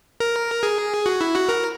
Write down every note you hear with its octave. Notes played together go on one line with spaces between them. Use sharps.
A#4
G#4
F#4
E4
F#4
A#4